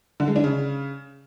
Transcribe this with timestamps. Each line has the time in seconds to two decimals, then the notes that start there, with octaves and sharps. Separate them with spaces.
0.20 D3
0.28 G#3
0.36 D4
0.44 C#3